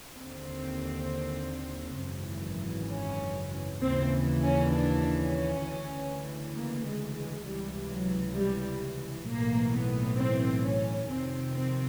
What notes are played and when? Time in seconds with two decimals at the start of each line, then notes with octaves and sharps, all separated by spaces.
0.19 D#2 D3 C4
2.01 G#1 F#2 C#3 E3
2.92 C#4
3.82 D#2 C#3 E3 C4
4.43 C#4
4.73 D4
5.18 C#4
5.64 D2 C#3 E3
6.55 A#3
6.85 G#3
7.15 G#3
7.45 C#2 C3 E3 G3
7.91 F#3
8.36 G3
9.26 B1 A2 E3 A#3
9.73 B3
10.17 C4
10.64 C#4
11.09 F2 C3 D#3 C4
11.55 C4